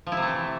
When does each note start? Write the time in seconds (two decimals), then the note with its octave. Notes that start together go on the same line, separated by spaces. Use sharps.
0.07 F3
0.12 E4
0.17 C3
0.22 A3
0.28 E3